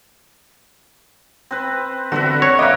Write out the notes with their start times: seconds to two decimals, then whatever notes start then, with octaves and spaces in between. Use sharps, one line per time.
1.51 C4 B4
2.12 D3 C4 F#4 B4 E5
2.42 C#5
2.59 A#3 D#5 E5 D6